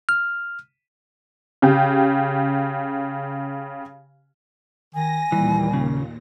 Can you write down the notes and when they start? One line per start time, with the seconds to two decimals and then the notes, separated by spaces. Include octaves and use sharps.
0.09 F6
1.62 C#3 G4
4.95 D#3 G#5 A#6
5.32 D#2 A#2 E3 G3
5.73 C#3